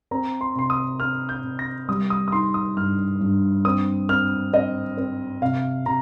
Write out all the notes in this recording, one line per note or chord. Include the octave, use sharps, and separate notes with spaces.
C4 A#5
C6
C3 C6
D#6
C4 F6
G6
C3
A#6
G3 D#6
D#6
D#6
D#4 C6
D#6
G2 F6
G2
C4 D#6
C4 F6
C4 D#5
C4
C3 F5
C3 A#5